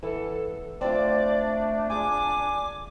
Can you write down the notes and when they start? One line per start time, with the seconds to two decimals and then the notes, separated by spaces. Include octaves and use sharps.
0.03 E3 B3 A4
0.81 A3 C4 D4 F4 D5
1.90 F4 G#4 G#5 D6